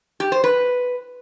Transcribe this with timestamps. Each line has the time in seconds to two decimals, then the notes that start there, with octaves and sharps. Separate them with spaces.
0.20 G4
0.32 C5
0.44 B4